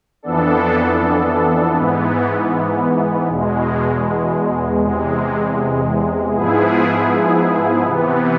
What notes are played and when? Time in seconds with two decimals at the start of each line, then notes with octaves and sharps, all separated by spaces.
0.23 F2 E3 B3 D4 A4
1.75 G#2 E3 B3
3.28 E2 B2 G#3
4.81 E2 C3 G#3
6.33 G#2 F3 B3 E4 G#4
7.86 C3 E3 B3